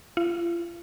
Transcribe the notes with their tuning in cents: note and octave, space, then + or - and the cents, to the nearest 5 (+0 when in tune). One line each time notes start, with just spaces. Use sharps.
F4 -40